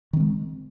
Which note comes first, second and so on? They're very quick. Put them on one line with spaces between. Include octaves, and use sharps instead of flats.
D#3 C4 G#3